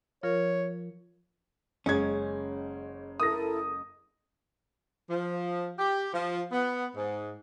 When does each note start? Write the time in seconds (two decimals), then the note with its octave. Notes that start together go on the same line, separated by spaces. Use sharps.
0.23 F3 F4 A#4 C#5
1.86 F#1 G#3 C#4 G#6
3.20 E4 A4 A#4 D#6 A#6
5.10 F3
5.78 G4
6.13 F3
6.51 B3
6.96 G#2